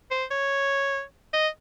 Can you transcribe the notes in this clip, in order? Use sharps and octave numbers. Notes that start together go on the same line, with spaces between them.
C5
C#5
D#5